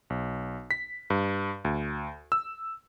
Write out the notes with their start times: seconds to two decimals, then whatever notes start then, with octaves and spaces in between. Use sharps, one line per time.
0.10 B1
0.71 B6
1.10 G2
1.65 D2
2.32 E6